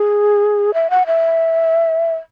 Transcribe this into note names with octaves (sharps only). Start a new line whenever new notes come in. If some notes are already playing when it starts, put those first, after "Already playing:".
Already playing: G#4
E5
F#5
E5